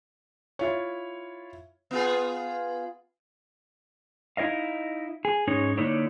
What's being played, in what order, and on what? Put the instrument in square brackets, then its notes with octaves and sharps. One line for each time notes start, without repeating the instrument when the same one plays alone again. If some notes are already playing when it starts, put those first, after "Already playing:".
[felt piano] E4 F4 C#5
[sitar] B3 F4 G#4
[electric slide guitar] D#4 E4 C#5 D#5 F5
G#4
G#2 C#4 D#4 G#4 C#5
D3 A#3 D#4 E4 C#5 D5